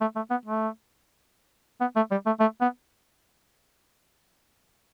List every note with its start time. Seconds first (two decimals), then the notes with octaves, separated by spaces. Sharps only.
0.01 A3
0.16 A3
0.31 B3
0.46 A3
1.81 B3
1.96 A3
2.11 G3
2.26 A3
2.40 A3
2.61 B3